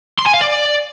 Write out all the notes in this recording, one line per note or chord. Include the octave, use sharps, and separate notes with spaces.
C6
G#5
F5
D5